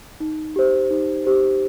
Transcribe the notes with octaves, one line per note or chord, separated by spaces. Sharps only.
D#4
G4 C5
D#4
G4 C5